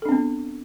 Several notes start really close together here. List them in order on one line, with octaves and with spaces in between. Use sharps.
A4 D4 C4 B3